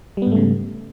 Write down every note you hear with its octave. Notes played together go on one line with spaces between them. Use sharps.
G#2 C#3 G3 A3 B3